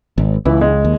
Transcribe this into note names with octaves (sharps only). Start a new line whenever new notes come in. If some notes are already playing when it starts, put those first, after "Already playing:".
G#1
C#2 E3 E4
G#3
D#2